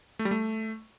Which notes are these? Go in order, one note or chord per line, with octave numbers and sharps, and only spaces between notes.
A3
G3
A3